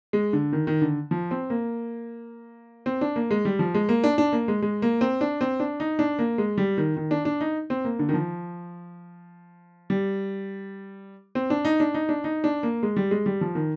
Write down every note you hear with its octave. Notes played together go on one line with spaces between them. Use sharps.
G#3
D3
D#3
D#3
D3
F3
C4
A#3
C4
D4
A#3
G#3
G3
F3
G#3
A#3
D4
D4
A#3
G#3
G#3
A#3
C4
D4
C4
D4
D#4
D4
A#3
G#3
G3
D#3
D#3
D4
D4
D#4
C4
A#3
D3
D#3
F3
G3
C4
D4
D#4
D4
D#4
D4
D#4
D4
A#3
G#3
G3
G#3
G3
F3
D#3